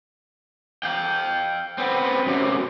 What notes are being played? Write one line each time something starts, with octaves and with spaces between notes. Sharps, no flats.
F5 G5
B3 C4
F#2 C3